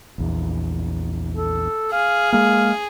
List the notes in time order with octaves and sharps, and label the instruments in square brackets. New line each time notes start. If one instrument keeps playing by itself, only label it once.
[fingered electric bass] A#1 E2
[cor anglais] A4
[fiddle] G#4 [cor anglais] F5
[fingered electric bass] G#3 A#3 [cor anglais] F5